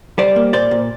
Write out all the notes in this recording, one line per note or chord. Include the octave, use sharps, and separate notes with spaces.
G3 C5 D5
A#3
A#2 C5 D5
A#2